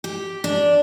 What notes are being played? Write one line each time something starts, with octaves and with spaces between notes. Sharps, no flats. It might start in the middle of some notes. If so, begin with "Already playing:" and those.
G4
D4